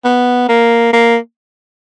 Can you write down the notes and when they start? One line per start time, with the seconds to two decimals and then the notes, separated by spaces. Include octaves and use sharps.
0.05 B3
0.49 A#3
0.93 A#3